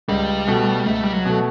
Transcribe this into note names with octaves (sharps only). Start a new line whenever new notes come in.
C#2 G3
B2 A3
C#2 A3
G3
F#3
B2 A3